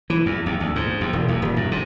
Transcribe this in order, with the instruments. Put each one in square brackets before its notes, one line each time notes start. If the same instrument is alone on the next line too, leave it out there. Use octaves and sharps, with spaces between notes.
[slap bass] E3
E2
D#2
D2
G#2
D#2
E1
D#2
D#1
F#2
C3